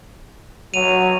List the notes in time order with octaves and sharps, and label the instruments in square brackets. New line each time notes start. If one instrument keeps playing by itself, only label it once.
[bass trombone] F#3 [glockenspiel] D#7 F7